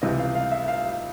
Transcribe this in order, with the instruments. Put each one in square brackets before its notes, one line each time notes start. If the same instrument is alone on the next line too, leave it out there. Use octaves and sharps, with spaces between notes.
[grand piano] C#2 C3 E3 G3 D#5
F5
F5
E5
F5